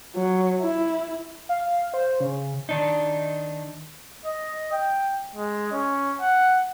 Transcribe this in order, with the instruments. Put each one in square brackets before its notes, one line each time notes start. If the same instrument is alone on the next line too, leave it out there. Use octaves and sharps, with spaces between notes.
[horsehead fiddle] F#3
E4
[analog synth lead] F5
C5
C#3
[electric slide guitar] D#3 D4 D#4
[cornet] D#5
G5
G#3
C#4
F#5